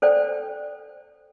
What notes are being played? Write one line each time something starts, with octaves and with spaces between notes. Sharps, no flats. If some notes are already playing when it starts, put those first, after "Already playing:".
A4 C5 D5 G5